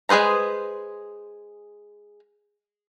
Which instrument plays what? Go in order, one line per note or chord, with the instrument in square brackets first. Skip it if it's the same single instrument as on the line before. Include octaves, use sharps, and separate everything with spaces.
[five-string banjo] G#3 G#4 B4 C5 A#5